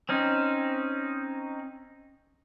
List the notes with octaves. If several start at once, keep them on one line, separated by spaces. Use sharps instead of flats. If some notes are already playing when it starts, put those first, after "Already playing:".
C4 C#4 D#4